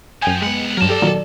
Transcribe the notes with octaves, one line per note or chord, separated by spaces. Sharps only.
F#2 F3 G5 G#5
C2 G#3 B3 F#5
G2 F#3 A#4 A5
G4 A4 D5
A#2 D#3 F#3